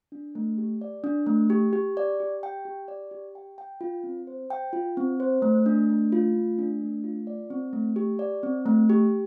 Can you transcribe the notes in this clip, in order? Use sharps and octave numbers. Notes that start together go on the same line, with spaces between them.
D4
A3
G4
D5
D4
A3
G4
G4
D5
G4
G5
G4
D5
G4
G5
G5
F4
C4
C5
G5
F4
C4
C5
A3
D4
A3
F4
A3
D4
A3
F4
D5
C4
A3
G4
D5
C4
A3
G4